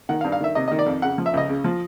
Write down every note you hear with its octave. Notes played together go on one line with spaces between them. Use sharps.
D#3 F#5
F5
G2
F5
D#3 E5
C3 D#5
D#3 D#5
D5
F2
C#3 F#5
F3
E5
C#2 D#5
C#3
F3